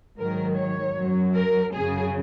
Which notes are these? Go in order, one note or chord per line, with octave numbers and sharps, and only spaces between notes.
G#2 D#3 F#3 A#4
C#5
F#2 F#3
A#4
F#2 C#3 F#3 G#4